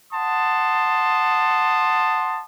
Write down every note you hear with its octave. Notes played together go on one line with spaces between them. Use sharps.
F#5 A5 C6 D#6